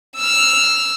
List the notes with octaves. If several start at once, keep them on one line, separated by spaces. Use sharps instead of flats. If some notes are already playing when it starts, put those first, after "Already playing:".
E6 F6